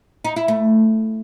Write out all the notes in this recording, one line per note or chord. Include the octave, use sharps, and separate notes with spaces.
D#4
E4
A3